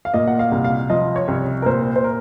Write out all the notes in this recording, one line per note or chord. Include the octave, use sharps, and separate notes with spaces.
F5
A#2 D#5
F#5
F5
C2
F5
F3 D#5
C#5
C2
A#4
A#2 C5
C5
A#4